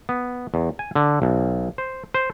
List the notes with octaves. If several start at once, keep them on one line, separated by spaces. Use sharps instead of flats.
B3
E2
G#5
D3
B1
C5
C5